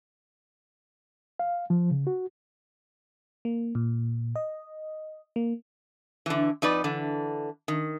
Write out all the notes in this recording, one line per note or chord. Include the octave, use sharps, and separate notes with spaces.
F5
F3
C#3
F#4
A#3
A#2
D#5
A#3
D3 E3
F2 D#4 B4 D5
D3 E3
D#3